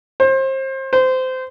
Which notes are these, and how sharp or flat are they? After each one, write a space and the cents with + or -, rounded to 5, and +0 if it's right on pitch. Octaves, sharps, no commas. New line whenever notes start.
C5 +30
C5 -20